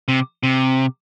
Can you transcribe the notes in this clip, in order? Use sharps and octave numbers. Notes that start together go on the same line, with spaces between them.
C3
C3